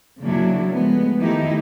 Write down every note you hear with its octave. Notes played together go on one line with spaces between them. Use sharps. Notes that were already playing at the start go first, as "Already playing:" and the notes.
C#3 F#3 A#3 D4 E4
F3 G#3 A3 B3
D#3 A3 D#4 E4 G4